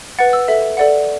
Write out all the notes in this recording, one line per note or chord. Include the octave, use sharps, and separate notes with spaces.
B4 F#5 A6
E6
A4 E5
A4 D5 F#5